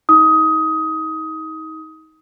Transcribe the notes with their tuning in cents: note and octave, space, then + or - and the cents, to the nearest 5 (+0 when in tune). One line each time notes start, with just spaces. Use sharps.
D#4 +30 D#6 +20